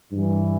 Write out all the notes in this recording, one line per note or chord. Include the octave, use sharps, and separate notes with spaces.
G2 E3